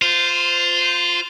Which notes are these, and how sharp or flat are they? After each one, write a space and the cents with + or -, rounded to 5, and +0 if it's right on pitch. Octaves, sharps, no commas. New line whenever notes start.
F4 +5 C5 -15